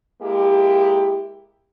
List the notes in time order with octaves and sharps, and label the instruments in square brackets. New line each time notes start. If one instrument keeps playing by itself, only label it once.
[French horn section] G#3 A#3 E4 G4